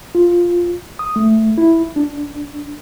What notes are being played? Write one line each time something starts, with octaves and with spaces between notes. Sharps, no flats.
F4
D#6
A3
E4
D4